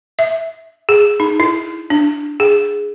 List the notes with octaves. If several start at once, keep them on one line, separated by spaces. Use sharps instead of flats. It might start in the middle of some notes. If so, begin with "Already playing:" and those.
E5
G#4
D#4
E4
D4
G#4